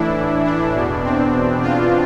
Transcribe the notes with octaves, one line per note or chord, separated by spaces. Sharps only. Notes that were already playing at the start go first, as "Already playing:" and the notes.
Already playing: A2 E3 D4 E4
D4
E2 B2
C4
F4